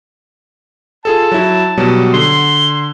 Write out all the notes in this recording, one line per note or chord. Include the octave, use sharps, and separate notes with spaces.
F4 G#4 A4 A5
F#3 E4
B2 F#3 G3
D3 C6